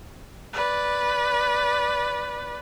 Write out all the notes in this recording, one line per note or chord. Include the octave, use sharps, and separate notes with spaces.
B4 D5